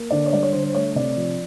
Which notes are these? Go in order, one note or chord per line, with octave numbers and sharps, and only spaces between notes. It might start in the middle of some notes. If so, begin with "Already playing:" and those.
Already playing: A#3
D3 D5
C#5
G3 D5
C#5
D3 C5
C5
A3 C#5
C3 D5
F3